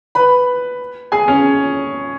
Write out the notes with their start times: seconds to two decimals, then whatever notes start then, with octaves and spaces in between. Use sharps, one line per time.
0.15 B4 B5
1.12 G#4 G#5
1.28 C#4 C#5